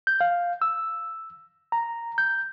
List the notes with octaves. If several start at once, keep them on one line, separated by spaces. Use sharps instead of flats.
G6
F5
E6
A#5
G6